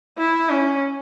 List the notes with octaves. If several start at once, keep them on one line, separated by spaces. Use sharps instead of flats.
E4
C#4